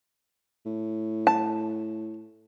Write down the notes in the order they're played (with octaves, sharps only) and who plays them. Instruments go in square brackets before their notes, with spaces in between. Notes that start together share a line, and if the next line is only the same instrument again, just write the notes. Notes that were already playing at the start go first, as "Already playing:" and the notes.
[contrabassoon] A2
[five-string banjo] A5